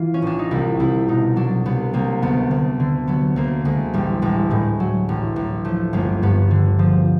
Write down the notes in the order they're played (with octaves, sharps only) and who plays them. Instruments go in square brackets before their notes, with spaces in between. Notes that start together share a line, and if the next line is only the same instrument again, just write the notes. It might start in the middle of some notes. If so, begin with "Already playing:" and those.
Already playing: [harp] E3 F4
C#4
A1 D4
D#4
C2 E4
C2 E4
B2 D#4
F#3 D4
C2 B3
C2 A#3
D2 B3
D2
D3
F#3 B3
D2 A#3
D2 G#3
A1 G3
A1 G#3
A2 G#3
F#3
A1
A1
F3 A3
G1 A#3
G2 B3
D3
F3